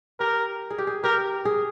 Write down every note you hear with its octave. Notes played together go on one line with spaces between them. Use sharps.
G4 A#4
G#4
G4
G#4
G4 A#4
G#4